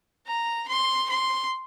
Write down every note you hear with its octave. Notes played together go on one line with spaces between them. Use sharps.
A#5
C6
C6